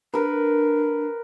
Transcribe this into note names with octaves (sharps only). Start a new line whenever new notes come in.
D4 A#4 B4